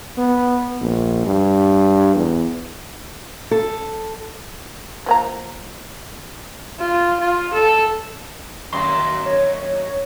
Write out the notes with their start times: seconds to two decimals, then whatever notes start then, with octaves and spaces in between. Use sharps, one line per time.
0.17 B3
0.81 A#1
1.25 G2
2.15 E2
3.51 A4
5.06 F3 A#3 A#5
6.79 F4
7.20 F4
7.53 A4
8.73 F#2 D#3 A#3 C6
9.26 C#5